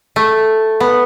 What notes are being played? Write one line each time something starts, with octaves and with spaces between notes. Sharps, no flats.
A3
B3